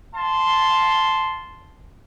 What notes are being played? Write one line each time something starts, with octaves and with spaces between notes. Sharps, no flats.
F5 A5 C6